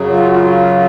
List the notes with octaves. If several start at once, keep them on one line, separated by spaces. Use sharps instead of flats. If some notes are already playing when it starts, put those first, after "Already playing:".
Already playing: F#2 C#3 F#3
F4
F#4
F4